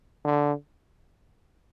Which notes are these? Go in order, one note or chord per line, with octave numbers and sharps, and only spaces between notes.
D3